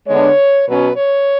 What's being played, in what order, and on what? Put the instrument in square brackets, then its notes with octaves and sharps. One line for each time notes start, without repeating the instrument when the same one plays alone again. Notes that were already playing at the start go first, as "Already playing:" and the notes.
[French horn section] D3 G#3 B3 D4 C#5
B2 F#3 C#4 B4
C#5